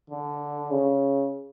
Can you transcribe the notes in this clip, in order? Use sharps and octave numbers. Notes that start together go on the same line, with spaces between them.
D3
C#3